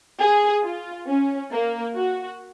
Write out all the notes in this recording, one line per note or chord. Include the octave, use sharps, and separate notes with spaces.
G#4
F4
C#4
A#3
F#4